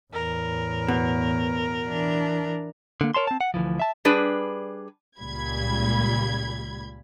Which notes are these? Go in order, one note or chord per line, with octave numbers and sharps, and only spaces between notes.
E2 A2 A#4
B2
E3 D4
D3 A#3
A#4 C#5 A5 C6
C4 A5
F#5
D2 B2 E3 F3
E5 A5
G3 D4 G#4 B4
C#2 A#2 G3 B5 G#6